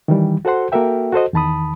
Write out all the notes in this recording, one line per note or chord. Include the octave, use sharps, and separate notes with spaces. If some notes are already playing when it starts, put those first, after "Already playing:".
D#3 E3 G3
F#4 A4 C5 F#5 C6
A#3 F#4 A4 A#4 E5 G5
F#4 A4 C5 D#5
E2 D#3 A5 B5 D#6